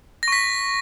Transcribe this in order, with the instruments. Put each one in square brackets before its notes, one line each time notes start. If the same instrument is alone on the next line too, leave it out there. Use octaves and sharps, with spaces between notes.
[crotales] A#6
C#6
B6